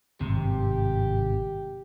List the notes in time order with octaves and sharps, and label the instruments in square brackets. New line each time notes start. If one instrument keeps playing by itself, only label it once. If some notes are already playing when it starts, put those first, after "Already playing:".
[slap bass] G#1 G2 [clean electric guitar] C3 [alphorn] G4